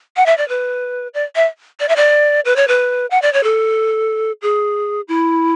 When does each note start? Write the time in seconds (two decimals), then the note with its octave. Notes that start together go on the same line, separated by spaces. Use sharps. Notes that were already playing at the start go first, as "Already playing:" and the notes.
0.16 F#5
0.26 E5
0.38 D5
0.49 B4
1.14 D5
1.36 E5
1.80 D5
1.89 E5
1.96 D5
2.45 B4
2.56 C#5
2.68 B4
3.11 F#5
3.22 D5
3.33 C#5
3.44 A4
4.42 G#4
5.08 E4